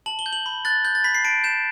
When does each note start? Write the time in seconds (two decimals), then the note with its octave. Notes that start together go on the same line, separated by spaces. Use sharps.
0.06 A5 F#7
0.19 G7
0.26 G6
0.33 F#7
0.46 B5
0.65 F#6 A6
0.85 F#6 G6
0.95 A6
1.04 B5 B6
1.15 C7
1.24 A5 D7
1.44 G6 E7